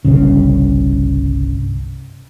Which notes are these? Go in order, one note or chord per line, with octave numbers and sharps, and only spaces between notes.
G1 C2 G2 C#3